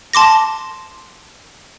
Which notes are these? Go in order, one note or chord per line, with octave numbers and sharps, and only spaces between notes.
A5 C6 D6 A#6